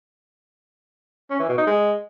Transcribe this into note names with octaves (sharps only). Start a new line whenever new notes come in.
C#4
E3
B2
D#4
G#3